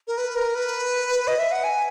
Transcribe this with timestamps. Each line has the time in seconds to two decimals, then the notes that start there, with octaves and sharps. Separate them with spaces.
0.08 A#4
0.18 B4
0.36 A#4
0.55 B4
1.27 D#5
1.39 E5
1.52 F#5
1.64 G#5